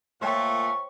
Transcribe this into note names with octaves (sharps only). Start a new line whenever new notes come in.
A#2 A3 C5 C#5 F5 G5 C#6